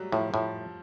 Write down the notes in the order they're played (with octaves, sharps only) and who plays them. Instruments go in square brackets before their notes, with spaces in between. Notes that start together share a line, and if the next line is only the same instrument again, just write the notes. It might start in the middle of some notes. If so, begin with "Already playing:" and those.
Already playing: [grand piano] F#3 G3 A3
[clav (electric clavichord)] A2 [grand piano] F3
[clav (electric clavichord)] A2 [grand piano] F3